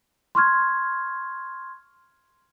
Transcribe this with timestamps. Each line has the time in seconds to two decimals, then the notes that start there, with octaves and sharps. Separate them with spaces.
0.35 C6 C#6 F6 G#6